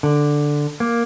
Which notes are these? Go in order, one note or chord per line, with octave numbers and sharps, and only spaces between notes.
D3
A#3